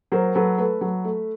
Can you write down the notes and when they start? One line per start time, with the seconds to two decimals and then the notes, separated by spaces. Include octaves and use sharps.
0.12 F#3 A#4 C5
0.35 F#3 A4 B4
0.58 A3 A4 B4
0.81 F#3
1.04 A3